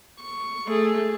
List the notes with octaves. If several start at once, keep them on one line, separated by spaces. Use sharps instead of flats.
C#6
A3 G#4